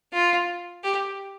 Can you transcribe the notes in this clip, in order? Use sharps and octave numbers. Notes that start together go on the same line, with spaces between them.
F4
G4